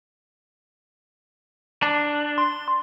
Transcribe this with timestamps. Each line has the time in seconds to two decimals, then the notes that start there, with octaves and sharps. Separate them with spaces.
1.83 D4
2.38 C6